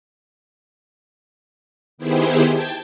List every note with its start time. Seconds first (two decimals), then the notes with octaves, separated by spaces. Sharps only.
1.98 D#3 B3 E4 G4 G#4 C5
2.45 G5 A5 G6 G#6